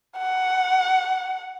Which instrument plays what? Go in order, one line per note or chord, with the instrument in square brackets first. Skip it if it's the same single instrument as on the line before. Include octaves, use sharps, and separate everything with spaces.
[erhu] F#5